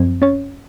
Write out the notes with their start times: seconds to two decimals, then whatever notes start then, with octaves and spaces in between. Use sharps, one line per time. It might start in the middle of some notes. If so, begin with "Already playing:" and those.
Already playing: F#2 F3 C4
0.22 C#4 C#5